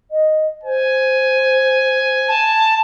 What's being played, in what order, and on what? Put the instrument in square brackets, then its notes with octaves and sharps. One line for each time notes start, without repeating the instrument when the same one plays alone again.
[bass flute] D#5
[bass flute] C5 [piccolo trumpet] G#5
[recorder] A5